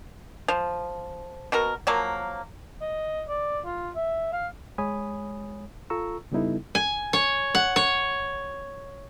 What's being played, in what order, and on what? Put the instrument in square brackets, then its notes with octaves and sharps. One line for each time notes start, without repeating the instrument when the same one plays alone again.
[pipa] F3
B2 F#4 A#4
F3 F#3 A#3
[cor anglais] D#5
D5
F4
E5
F5
[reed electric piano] G#3 C#5 G#5 B5 D#6
F4 A4 A#5 C#6 E6
C#3 G3 B3 D#4 E4 A4
[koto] G#5
C#5
F#5
C#5